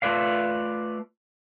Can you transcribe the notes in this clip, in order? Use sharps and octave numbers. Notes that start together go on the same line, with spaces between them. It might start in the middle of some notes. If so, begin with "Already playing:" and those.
A3 F4 A4 B4 D5 F5